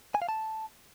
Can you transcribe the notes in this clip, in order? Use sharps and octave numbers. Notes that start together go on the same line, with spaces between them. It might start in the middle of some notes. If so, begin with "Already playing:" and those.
G#5
F5
A5